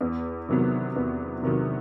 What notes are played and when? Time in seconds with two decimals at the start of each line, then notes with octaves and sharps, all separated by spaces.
0.01 E2
0.49 C3 D#3 F#3 B3
0.96 E2
1.43 C3 D#3 F#3 B3